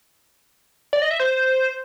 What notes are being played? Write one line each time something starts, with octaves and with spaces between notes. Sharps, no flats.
D5
D#5
E5
C5